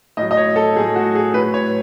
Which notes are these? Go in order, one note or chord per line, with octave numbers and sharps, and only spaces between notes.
A2 F#3 D#5
D#5
C#5
A4
A2 F#3 G#4
F#4
G#4
A2 F#3 B4
C#5